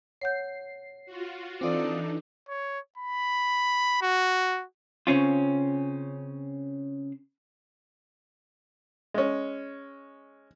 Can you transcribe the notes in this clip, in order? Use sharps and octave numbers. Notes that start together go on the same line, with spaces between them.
C#5 F#5 G6 C7
F4 F#4
E3 C4 D4 D#4 F4 A4 D5 D#6
C#5
B5
F#4
C#3 C4 C#4 F4
G#3 C#4